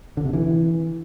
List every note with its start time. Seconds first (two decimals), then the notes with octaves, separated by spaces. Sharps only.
0.17 D3
0.25 C3
0.33 E3